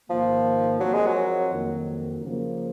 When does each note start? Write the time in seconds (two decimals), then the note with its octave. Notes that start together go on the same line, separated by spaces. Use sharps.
0.10 G#2 D#3 F3 A#3
0.80 F3 F#3 C4 F4 A#4 C#5
0.93 G#3
1.07 F#3
1.50 F2 D#3 F#3 A#3
2.21 C#3 F3 A#3